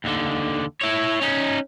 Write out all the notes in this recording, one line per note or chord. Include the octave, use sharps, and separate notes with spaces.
D#2 D3
E4 C#5
C#4 D#4